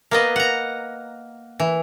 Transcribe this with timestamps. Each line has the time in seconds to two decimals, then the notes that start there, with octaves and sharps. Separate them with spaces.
0.11 A#3 B3 D#5
0.36 F#5 A#5
1.60 E3